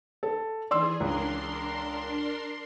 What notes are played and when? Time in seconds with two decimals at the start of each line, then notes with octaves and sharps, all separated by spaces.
0.23 A4
0.71 E3 G#4 D5 C6 E6
1.00 C#2 D4 A#4 C6